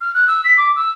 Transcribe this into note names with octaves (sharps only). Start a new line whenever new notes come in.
F6
F#6
E6
B6
D6
E6